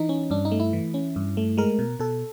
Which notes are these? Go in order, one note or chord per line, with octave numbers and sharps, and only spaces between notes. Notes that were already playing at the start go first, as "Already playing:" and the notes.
Already playing: E3 D#4
C#4
G2 D4
D#4
A3
E4
E3
C#4
G2
A3
G#3 A#4
B2
B2 A4